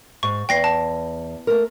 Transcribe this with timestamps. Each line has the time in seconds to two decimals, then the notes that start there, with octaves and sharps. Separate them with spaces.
0.23 G#2 C#6
0.49 E2 G5 A#6 C7
0.64 A5
1.47 A3 A#4